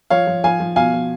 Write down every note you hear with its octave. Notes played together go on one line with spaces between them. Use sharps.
F3 C#5 F5
F3
F3 F5 G#5
F3
B2 F5 G#5
B2